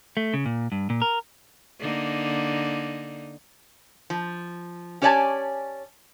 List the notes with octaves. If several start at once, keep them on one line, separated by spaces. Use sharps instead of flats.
A3
C#3
A#2
G2
A#2
A#4
D3 A#3 D#4
F3
C#4 G4 C#5 D5 G#5 A5